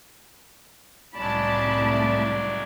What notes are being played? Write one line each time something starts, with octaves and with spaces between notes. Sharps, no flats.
C2 A2 C#3 F#3 G#3 D5 A5 B5